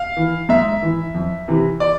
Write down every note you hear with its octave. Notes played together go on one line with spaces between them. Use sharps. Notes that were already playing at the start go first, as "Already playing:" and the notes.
Already playing: F5
E3
G#2 E5
E3
F2
C3 E3
D5